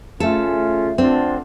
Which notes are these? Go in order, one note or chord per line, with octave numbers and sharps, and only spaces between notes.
C#3 A3 C#4 F4 A4
D3 C4 D4 F4